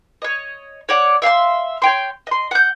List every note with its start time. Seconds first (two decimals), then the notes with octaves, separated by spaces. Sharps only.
0.22 C#5 D#5
0.89 C#5 D5 F#5
1.22 E5 F5 G5 C6
1.82 C#5 G5 C6
2.27 D#5 C6
2.51 F#5 G6